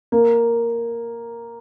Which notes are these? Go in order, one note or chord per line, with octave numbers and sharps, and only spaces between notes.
A#3